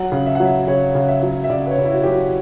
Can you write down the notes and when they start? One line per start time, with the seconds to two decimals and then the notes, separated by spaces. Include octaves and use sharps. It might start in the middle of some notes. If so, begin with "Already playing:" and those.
Already playing: F#3 F#5
0.12 C#3
0.26 E5
0.35 F#5
0.40 F#3
0.45 E5
0.67 C#3 C#5
0.95 C#3
1.08 E5
1.23 F#3
1.44 E5
1.50 C#3 D5
1.66 B4
1.71 C#5
1.78 C#3
1.85 E4
1.92 F#4
2.03 F#3 G4
2.12 F#4